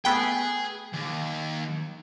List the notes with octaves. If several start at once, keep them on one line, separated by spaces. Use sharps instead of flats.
A3 B3 G#4 G5
D#2